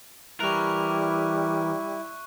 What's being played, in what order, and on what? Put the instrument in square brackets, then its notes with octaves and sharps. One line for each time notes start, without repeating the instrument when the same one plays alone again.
[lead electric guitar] E3 A#4 [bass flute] G3 [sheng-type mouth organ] E4 [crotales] C#6 F#6